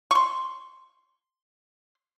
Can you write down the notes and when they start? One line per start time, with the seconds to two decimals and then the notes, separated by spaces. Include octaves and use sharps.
0.11 C6 C#6